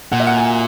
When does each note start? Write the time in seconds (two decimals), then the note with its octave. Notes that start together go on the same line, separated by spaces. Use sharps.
0.12 A#2 F#5
0.20 E5
0.27 F#5
0.37 G#5